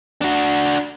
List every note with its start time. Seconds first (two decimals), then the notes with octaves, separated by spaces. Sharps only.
0.21 D4 F#4